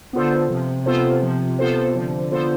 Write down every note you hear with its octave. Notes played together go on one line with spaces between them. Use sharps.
D3 B3 F4 A4 C5
C3 F3
B3 F4 A4 C5
F3
B3 F4 A4 C5
D3 F3
B3 F4 A4 C5